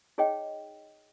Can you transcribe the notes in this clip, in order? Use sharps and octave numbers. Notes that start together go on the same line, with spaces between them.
D#4 G#4 C#5 D#5 G5